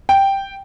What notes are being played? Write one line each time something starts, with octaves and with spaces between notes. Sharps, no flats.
G5